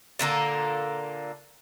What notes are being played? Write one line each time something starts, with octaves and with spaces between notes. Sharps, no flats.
A#2 D3 A#3 A4